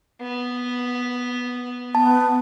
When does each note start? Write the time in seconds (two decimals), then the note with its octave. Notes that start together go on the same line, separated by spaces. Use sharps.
0.21 B3
1.95 B3 A5